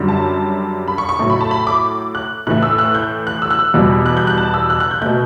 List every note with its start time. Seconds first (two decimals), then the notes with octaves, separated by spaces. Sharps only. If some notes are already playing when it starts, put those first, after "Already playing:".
Already playing: F#2 D3 G3
0.08 A5
0.88 B5
0.98 C#6
1.09 C#6
1.19 A2 F#3 A3 C#6
1.30 B5
1.41 A5
1.51 B5
1.67 D6
2.15 F#6
2.47 A2 E3 A3 F#6
2.63 E6
2.78 F#6
2.95 G6
3.27 F#6
3.42 E6
3.50 F#6
3.59 E6
3.74 E2 B2 G3
4.06 F#6
4.17 G6
4.27 F#6
4.38 A5
4.54 E6
4.70 F#6
4.80 F#6
4.91 G6
5.02 B2 A3 G6